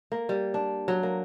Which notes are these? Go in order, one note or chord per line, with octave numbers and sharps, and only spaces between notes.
A#3
G3
D4
F#3
A#3